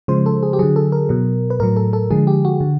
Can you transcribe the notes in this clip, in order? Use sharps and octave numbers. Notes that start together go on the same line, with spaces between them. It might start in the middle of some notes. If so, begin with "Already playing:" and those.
C#3 F3 G#3 C5
A4
G#4
G4
D3 F#3 G#4
A4
A#4
B2 F#3
B4
A2 F#3 A#4
A4
A4
D3 F3 G#3 G#4
G4
F#4
D3